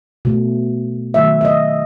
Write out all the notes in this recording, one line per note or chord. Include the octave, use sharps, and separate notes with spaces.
B2 A3
D#3 F#3 A3 E5
E5
D#5